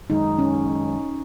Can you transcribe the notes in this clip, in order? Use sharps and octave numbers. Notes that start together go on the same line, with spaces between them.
F#2 D#3 G#3 D#4
C#4